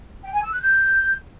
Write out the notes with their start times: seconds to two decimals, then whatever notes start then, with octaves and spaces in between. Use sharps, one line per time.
0.24 G5
0.33 G#5
0.42 E6
0.52 F#6
0.61 G6